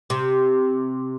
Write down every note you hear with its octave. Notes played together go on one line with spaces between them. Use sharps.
C3